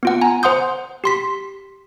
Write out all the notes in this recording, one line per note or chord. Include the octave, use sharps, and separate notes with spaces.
B3 F4 F#5
G#5 A#5
C5 F#5 C6 D#6 G6
G4 C6 B6